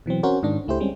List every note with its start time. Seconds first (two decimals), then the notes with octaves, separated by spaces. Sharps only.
0.06 B2 E3 F#3 C4
0.23 C4 C#4 F#4 A#4 C5
0.43 G#2 D#3 D4
0.67 C#2 A3 E4 G4 C5
0.80 G3 G#3 C4 C#4